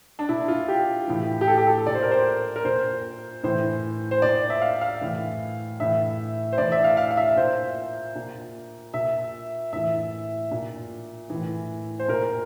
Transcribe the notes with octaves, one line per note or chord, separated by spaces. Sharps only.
D4
A#2 E4
F4
G4
A2 E3
G4
A4
G4
A4
A#2 D5
C5
A#4
C5
A#4
A#2 C5
A2 E3 C5
C5
A#2 D5
E5
F5
F5
A2 E3
A2 E3 E5
C5
A2 E3 D5
E5
F5
F5
F5
E5
A#2 C5
A#2
A#2 E5
A2 E3 E5
A#2
A2 E3
C5
A#2 A#4